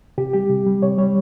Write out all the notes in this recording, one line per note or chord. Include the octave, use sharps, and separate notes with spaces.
C3 G4
G3 G4
C3
G3
C3 C#5
G3 C#5